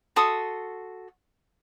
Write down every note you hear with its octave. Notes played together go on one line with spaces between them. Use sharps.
F#4 A4 C6 D#6